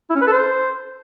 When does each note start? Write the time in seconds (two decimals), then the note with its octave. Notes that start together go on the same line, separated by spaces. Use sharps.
0.10 E4
0.16 C#4
0.21 B4
0.27 A4
0.33 C5